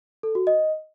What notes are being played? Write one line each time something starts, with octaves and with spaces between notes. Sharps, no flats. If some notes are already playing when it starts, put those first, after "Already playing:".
A4
F#4
D#5